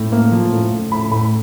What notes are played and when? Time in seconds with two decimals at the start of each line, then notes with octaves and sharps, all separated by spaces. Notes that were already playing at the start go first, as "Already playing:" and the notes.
Already playing: A2
0.12 A#3
0.32 F3
0.52 A2
0.72 A2
0.91 A2 B5
1.11 A2 B5